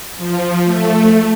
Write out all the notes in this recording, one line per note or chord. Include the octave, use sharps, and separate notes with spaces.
F3
A3